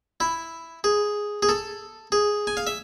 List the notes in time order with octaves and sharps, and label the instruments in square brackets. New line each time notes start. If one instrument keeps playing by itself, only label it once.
[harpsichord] E4
G#4
G#4
A4
G#4
G#5
F5
E5